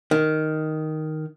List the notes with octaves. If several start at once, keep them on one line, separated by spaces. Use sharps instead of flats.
D#3